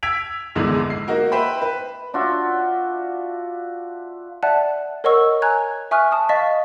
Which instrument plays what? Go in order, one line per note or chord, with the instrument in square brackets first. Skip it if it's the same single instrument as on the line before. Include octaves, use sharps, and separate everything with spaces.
[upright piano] E6 G#6 B6 D7 F7
A#1 E2 G#2 D3 G#3
C7
A#3 D#4 F#4 A#4
B4 C5 E5 G5 B5
B4
[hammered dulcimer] D4 F4 F#4 E5
[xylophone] D5 E5 F#5 A5 F#6
A#4 C#5 D#5 F#5 C#6 E6
G#5 A#5 F#6 G#6
E5 G#5 C#6 D#6 F6 F#6
A5 D#6
D#5 F5 A5 C#6 A6 B6